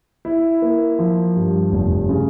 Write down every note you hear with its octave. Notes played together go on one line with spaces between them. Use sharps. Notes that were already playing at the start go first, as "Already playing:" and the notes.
E4
A#3
F3
G2
F1
C#3